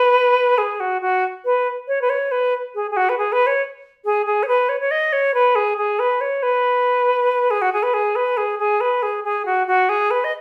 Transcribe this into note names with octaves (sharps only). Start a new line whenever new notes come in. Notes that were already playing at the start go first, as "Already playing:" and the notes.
Already playing: B4
G#4
F#4
F#4
B4
C#5
B4
C#5
B4
G#4
G#4
F#4
B4
G#4
B4
C#5
G#4
G#4
C#5
B4
C#5
C#5
D#5
C#5
B4
G#4
G#4
B4
C#5
B4
G#4
F#4
G#4
B4
G#4
B4
G#4
G#4
B4
G#4
G#4
F#4
F#4
G#4
B4
D#5